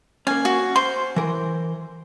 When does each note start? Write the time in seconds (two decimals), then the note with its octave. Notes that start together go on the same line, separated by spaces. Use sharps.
0.27 A#3 C#4 G#5
0.45 F#4
0.76 C5 C6
1.16 E3 A#4